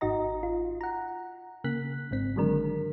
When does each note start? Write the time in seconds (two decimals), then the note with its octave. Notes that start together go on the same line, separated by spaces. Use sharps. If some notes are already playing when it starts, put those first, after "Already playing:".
0.01 G#1 D#4 F#4 D#5 A#5
0.43 F4
0.81 F#5 A#5
1.64 C#3 A#3 F#6 B6
2.11 G#1 G#2 C4 B6
2.36 D3 D#3 F#3 G#3 D4 A#4